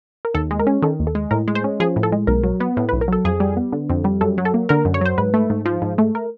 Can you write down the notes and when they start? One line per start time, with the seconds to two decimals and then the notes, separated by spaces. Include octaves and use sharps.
0.25 A#4
0.34 D#2 A4
0.51 G#3
0.59 A#4
0.67 C#4
0.82 D#3 A4
1.00 D#2
1.07 A4
1.15 G#3
1.31 A2 A#4
1.48 G#3
1.55 C5
1.64 C#4
1.80 F3 G#4
1.96 A2
2.03 A4
2.12 G#3
2.27 B1 A#4
2.43 F#3
2.60 B3
2.77 A2
2.89 B1 B4
3.01 A#4
3.08 F#3 A4
3.25 F2 G#4
3.40 G3
3.57 B3
3.72 D3
3.90 F2
4.04 G3
4.21 F#2 A4
4.38 F#3
4.45 A4
4.54 A#3
4.69 D3 A#4
4.85 F#2
4.94 C#5
5.01 F#3 C5
5.18 G#2 B4
5.34 A3
5.50 G#2
5.65 F3
5.82 G#2
5.98 A3
6.15 A#4